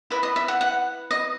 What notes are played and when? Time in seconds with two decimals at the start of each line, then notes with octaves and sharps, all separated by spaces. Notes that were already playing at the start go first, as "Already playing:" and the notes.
0.10 E4 B4 D#5 E5
0.23 D#5
0.36 E5
0.48 F#5
0.61 F#5
1.11 D#5